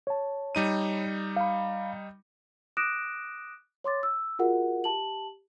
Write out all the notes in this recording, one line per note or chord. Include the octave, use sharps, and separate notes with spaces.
C#5 A5
G3 D#4 D#7
F5 B5
D6 D#6 F#6 A#6 D7 E7
C#5 C6 D6 A6
E6
F4 F#4 G#4 A#4 E5 F#5
G4 A5 F#7